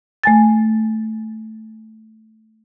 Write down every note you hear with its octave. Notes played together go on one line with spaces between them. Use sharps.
A3 G#5 A6